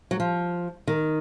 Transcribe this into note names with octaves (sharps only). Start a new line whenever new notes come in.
F#3
F3
D#3